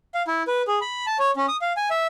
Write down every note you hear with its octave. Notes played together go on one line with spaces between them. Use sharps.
F5
E4
B4
G#4
B5
A5
C#5
C#4
D#6
F5
G#5
E5